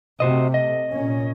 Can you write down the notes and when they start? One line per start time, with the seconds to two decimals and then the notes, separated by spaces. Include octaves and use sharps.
0.20 C3 A3 F#4 C5 D#5
0.54 D#5
0.91 A#2 C#4